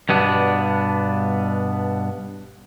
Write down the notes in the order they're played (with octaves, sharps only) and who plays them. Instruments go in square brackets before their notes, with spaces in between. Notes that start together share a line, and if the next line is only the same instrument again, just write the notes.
[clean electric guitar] G2 B2 B3 D4